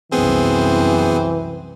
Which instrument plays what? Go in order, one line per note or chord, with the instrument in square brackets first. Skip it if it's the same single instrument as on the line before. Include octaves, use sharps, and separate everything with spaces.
[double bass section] C2 F#2 [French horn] E3 [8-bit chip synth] B3 G#4 [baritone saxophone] C4